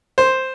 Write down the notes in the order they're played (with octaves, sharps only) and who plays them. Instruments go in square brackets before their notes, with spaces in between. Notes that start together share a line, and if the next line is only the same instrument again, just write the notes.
[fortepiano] C5